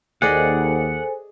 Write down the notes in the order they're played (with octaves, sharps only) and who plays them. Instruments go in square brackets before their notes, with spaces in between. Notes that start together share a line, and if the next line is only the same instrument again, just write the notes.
[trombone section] D#2 [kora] G#4 D5 D#5 [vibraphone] A4 C5 G#5 [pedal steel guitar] F#5